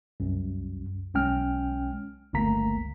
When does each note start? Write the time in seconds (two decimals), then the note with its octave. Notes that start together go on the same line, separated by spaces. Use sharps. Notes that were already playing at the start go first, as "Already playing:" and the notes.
0.20 C2 F#2
1.14 B1 G#3 C#4 G5 F6
2.33 G1 C#2 A3 A#3 A#5 B6